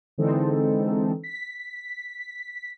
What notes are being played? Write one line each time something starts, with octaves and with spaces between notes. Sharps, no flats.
D3 E3 G#3 C4 D#4 A4
B6